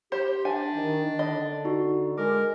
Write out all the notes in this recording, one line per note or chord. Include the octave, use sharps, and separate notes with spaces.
G4 C5
D4 G#5
D#3
D3 D#5
D#4 F#4
G#3 A#4 D6